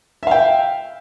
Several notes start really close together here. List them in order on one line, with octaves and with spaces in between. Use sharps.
E5 F5 G5